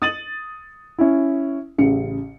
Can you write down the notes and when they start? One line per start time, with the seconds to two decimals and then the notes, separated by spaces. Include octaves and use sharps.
0.02 D#6 A6 D#7 F#7
0.99 C#4 E4
1.78 A1 C#3 C#7